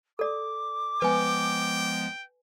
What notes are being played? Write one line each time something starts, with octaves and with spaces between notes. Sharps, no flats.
A4 D5 D6
F3 G#3 B3 B4 G5 G#5